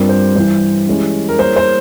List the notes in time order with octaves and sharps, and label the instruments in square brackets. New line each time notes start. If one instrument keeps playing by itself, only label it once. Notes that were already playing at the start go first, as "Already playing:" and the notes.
Already playing: [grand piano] G2 G3 C4 F4 A#4
[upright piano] C5
[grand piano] G2 E3 G3 [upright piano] C5
[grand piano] E3 G#3 C#4 E4 G4
[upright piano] A#4
[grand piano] G3 A#3 E4 G#4 C#5 [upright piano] C5
[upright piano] C5